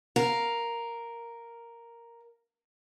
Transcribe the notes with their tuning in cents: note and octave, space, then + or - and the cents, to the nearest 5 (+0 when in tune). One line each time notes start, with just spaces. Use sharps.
A#4 +0 F5 +0